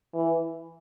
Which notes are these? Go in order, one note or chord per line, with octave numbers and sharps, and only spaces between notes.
E3